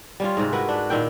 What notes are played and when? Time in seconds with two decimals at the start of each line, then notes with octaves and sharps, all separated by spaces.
0.20 G3 C#4 F4
0.37 G#2 C3
0.53 E4 F#4 A#4 B4
0.69 D4
0.90 A#2 D#3 E4 G5